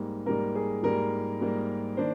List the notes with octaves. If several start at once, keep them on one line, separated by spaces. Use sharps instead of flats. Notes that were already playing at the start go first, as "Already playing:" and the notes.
Already playing: G#2 G3 A#3
G#2 G3 A#3 A#4
G#4
G#2 G3 A#3 A#4
G#2 G3 A#3
D#3 A#3 D4 C5